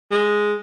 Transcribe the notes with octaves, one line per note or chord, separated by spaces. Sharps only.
G#3